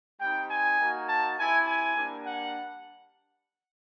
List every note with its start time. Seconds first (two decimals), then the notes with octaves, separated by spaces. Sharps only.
0.21 G3 C4 D#4 G5
0.50 G#5
0.80 A#3 D#4 F#4
1.08 A5
1.37 C4 E4 G4 G#5
1.68 G#5
1.97 G3 A#3 D4
2.26 F#5